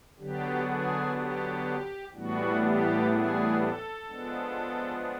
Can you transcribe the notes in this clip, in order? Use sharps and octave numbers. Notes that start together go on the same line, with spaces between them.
D3 F#3 B3 D4 G4
G#4
G4
A2 E3 G3 B3 D4 F#4
G4
G#4
A4
F3 G#3 B3 D4